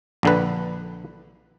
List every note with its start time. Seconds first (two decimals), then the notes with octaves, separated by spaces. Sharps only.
0.23 A#1 D3 B4